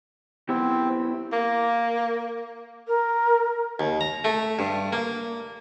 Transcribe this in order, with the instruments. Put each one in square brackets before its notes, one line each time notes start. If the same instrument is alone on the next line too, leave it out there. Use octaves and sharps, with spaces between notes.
[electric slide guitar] B3 E4 G4 [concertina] C4
[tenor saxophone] A#3
[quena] A#4
[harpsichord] D#2
A#5
A3
G2
A#3